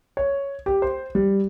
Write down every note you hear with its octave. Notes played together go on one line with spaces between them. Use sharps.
C#5
G4
C5
G3